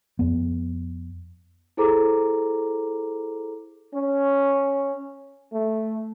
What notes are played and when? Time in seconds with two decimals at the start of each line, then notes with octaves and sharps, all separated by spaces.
0.19 F2 B3
1.77 E4 G#4 A4 C5 A#5 D6
3.95 C#4
5.53 A3